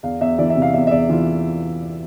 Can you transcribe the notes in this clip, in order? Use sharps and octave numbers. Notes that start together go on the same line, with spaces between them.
E2 F5
E2 E5
E3 D5
E5
C3
F5
E2 E5
E5
E2 D5
E3 F4